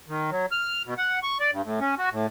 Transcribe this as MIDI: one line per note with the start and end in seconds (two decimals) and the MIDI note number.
0.08 0.30 51
0.31 0.46 54
0.52 0.82 89
0.86 0.94 47
0.98 1.19 78
1.23 1.38 85
1.40 1.51 74
1.52 1.62 43
1.64 1.80 45
1.80 1.95 61
1.98 2.09 66
2.12 2.27 45